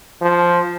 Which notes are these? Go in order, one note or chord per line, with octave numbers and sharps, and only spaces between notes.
F3